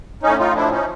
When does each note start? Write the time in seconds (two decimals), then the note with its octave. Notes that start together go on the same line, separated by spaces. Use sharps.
0.23 A2 C#4 D#4
0.39 D#4 F4
0.55 F3 D4 E4
0.71 C#4 D#4